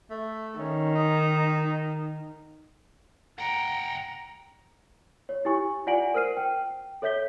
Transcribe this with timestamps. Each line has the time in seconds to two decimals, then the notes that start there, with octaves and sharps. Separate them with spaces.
0.10 A3
0.59 D#3 C#4
0.95 D#4
3.39 F#5 G5 A#5
5.29 C#5
5.45 E4 G4 G#5 C#6
5.87 F4 D5 F#5 G#5 D7 F#7
6.14 A#4 C5 F6 C7 D#7
6.37 G5
7.02 A4 C#5 E5 G6 B6 G7